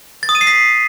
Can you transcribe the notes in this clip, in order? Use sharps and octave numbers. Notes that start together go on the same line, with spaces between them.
A6
D#6
D#7
C7
B6